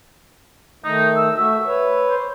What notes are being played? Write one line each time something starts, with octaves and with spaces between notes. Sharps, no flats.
D#3 A3 D#4
E6
A3 F#4 E5
B4 C#5
C5